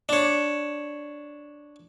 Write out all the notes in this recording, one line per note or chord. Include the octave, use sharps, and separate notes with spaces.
D4 C#5